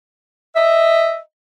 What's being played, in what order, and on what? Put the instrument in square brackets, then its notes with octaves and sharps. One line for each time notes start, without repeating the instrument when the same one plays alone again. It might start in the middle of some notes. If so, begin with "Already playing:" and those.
[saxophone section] D#5 E5